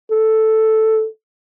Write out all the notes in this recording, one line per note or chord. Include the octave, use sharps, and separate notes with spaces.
A4